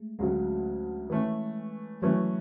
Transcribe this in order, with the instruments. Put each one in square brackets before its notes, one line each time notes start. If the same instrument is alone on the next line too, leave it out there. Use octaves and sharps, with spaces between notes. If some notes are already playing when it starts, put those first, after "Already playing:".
Already playing: [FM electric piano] G#3 A3
[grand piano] D2 C#3 F#3 [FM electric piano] G#3
[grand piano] E3 A3 C#4
[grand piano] E3 A3 C#4 [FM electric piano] F#3